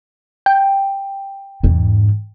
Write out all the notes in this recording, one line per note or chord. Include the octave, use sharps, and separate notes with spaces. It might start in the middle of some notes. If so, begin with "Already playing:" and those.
G5
E2 G#2